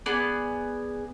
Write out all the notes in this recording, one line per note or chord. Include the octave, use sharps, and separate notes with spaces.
B3 G#4 D5